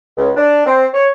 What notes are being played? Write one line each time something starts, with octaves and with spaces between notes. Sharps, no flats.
C#2
D4
C4
C#5